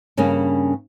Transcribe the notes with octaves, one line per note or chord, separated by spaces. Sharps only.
G2 C#3 A#3 C#4